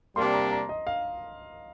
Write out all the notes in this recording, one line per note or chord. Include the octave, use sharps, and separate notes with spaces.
C3 G3 A#3 D4 C6
A#5
A#5
D#5
F5